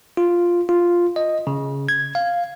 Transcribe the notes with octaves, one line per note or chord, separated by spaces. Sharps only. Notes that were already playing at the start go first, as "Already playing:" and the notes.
F4
F4
D#5
C#3
G#6
F5